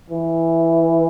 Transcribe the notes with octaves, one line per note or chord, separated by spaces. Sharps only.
E3